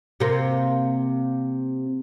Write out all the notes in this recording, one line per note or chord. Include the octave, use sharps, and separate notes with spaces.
C3 A#3